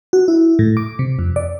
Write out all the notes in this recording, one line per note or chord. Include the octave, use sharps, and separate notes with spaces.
F#4
E4
A2
D6
C3
F2
D5